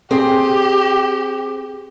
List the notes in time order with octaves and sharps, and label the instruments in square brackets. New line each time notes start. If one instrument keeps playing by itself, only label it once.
[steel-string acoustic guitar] C4 G#4 G5 [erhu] G4